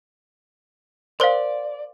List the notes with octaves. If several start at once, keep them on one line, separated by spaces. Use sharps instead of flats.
A#4 C5 D5 F5 C6